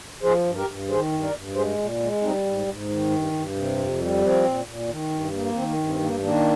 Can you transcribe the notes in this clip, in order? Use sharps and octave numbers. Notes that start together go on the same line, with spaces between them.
F3 G#4 C5
G2
G4 A#4
G2
D#3 G#4 C5
G2
A#4 D5
G2
G#3 G#4 C5
A#2
G#3
G3 C4 D#4
G#2
G#2
D#3
G2
G2
C3
F2
G3
F3 C4
A#2
A#2
D#3
G2
A#3
D#3 C4
G2
C4
A#3
D#3 A#3 D4